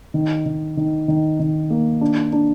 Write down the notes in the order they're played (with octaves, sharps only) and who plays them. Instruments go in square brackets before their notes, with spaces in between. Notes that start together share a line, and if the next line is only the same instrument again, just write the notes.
[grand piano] D#3
D#3
D#3
D#3
D#3
A#3
D4
D4